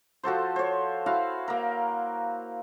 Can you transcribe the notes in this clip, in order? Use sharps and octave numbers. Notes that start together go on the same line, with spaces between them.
F3 F#4 A4 C5
C5 C#5
E4 F#4 F5
A#3 A#4